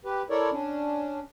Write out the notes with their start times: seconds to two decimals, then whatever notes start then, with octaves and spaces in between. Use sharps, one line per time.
0.05 G4 B4
0.30 E4 A4 A#4 C#5 D5
0.52 C#4 D4